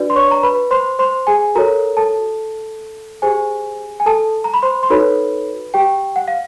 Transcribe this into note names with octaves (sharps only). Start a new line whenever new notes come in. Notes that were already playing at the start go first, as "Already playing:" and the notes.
Already playing: D4 F#4 B4 D5
C6
C#5 C#6
A#5
B4 B5
C5 C6
C5 C6
G#4 G#5
F#4 A4 A#4 C#5 A#5
A4 A5
G4 G#4 C5 G#5
G#5
A4 A5
A#5
B5
C5 C6
C6
D#4 F#4 A4 B4 C#5 B5
G4 G5
F#5
F5